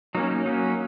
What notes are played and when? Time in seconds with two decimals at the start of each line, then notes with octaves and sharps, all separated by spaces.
0.15 F#3 A#3 C#4 D#4
0.30 D#4
0.46 F#3 A#3 C#4 D#4